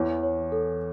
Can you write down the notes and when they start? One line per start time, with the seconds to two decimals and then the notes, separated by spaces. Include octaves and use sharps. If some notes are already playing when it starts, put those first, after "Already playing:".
Already playing: E2 E3 C#5
0.23 C#5
0.52 A4